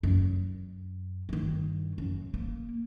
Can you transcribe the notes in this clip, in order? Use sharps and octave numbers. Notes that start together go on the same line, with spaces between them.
F#2
G2 D#3
F#2
A#3